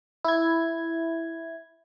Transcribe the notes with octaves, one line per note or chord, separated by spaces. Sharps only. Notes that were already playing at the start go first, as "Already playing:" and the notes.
E4 G#6